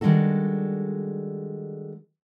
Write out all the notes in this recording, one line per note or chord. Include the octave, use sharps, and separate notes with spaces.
D#3 G3 G#3 D4 F#4 A4